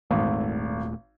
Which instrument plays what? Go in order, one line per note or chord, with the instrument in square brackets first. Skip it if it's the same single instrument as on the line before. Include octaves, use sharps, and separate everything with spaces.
[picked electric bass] D#1 A#2 A3 [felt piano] G#1